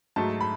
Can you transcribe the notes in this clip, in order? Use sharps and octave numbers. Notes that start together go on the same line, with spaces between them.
G#2 F#3 A3 A5
B5